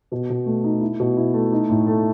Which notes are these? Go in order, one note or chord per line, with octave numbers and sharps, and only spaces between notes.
B2
B2
A3
D#4
E4
B2
E4
A3
D#4
A2
A3